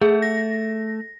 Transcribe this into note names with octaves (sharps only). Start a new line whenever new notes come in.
A3 G#4
A#6